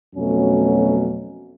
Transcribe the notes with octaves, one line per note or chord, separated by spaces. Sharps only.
F2 B2 F#3 A3 C#4